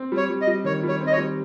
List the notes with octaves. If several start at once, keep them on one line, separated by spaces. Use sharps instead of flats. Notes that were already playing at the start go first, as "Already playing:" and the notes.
Already playing: C4
G3
C#5
G3
D#5
G3
D#3 C#5
G3
C#5
C4
D#5
C#5
G3